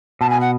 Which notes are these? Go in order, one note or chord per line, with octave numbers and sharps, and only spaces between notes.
B2 A5
G#5
F#5